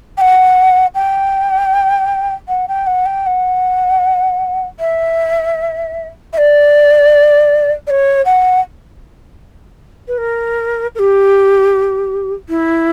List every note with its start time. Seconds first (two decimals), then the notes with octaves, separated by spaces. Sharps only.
0.17 G5
0.21 F#5
0.95 G5
2.48 F#5
2.68 G5
2.87 F#5
3.06 G5
3.26 F#5
4.80 E5
6.33 E5
6.38 D5
7.87 D5
7.90 C#5
8.25 F#5
10.08 B4
10.18 A#4
10.95 A#4
10.99 G4
12.49 E4